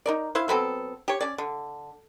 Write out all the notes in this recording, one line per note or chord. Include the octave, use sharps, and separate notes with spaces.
D#4 A#4 D5
E4 C5 E5 F5
F#3 B3 C4 A4
G4 C#5
C#4 D5
D3